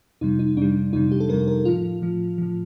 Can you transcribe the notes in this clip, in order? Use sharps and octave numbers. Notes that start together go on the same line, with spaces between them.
F2 C3 G3 D#4
D#4
F2 C3 G3 D4
F2 C3 G3 D#4
G4
A4
F2 C3 G3 A#4
A#4
A2 F3 F4
A2 F3
A2 F3